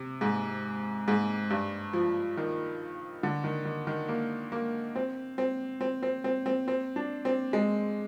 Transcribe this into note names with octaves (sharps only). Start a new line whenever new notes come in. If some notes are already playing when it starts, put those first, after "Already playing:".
Already playing: C3
G#2
G#2
G2
F3
D#3
D3
D#3
D#3
D#3
A#3
A#3
C4
C4
C4
C4
C4
C4
C4
D4
C4
G#3